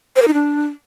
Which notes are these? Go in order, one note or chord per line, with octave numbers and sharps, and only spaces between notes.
C5
A#4
D#4
D4